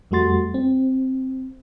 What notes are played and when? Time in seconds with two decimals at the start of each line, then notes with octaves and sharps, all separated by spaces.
0.11 F2 G3 A3 F#4 C6 A6
0.54 C4